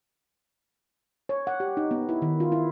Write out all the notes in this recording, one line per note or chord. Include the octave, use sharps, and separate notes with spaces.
C#5
F#5
G4
D#4
B3
E4
D#3
F4
E4